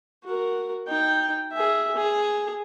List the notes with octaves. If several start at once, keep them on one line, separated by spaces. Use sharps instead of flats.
F#4 A#4
D#4 G5
G#4 E5
G#4